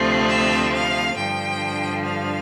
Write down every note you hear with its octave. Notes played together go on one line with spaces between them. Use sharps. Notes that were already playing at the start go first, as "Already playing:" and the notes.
Already playing: D2 C3 F3 A3 C4
E5
F5
G2 D3 F3 G5
F5